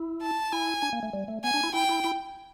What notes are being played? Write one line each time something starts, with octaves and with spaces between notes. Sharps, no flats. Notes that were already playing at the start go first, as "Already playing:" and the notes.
Already playing: E4
A5
E4 G#5
D4
A#3
A3
G3
A3
B3 G#5
D4
E4
E4 G5
E4
E4